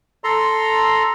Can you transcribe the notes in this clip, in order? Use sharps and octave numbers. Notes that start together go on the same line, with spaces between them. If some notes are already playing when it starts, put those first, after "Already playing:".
A4 A#5 C6